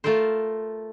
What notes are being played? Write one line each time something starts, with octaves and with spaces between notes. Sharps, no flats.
A3 F4 A4 A#4 C5